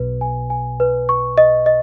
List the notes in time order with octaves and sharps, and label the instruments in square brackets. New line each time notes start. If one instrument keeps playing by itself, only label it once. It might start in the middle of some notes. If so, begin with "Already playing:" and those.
Already playing: [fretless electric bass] B1 [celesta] B4
[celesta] G#5
G#5
B4
C#6
D#5
D#5